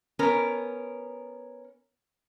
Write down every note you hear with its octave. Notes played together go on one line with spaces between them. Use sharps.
B3 C#4 A#4